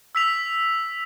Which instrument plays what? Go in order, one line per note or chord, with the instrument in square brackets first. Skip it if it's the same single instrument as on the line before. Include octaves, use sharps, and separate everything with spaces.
[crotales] E6 B6 F7